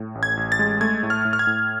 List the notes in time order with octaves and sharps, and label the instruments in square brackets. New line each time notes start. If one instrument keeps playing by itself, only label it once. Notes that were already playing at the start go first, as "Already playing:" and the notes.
Already playing: [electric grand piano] A2
A1
G#6
A1
A6
G#3
A3 G#6
A2
F6
A2
F6
G#6
A2